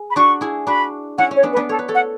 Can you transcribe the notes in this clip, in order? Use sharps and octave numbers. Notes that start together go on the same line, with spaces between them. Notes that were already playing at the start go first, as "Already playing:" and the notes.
Already playing: G#4
B5
D4 F#4 C#6
E4 G#4
D4 F#4 B5
C#4 E4 F#5
C#4 C#5
B3 D4
B4
B3 D4
A4 C#5
B4
A4 C#5
F#5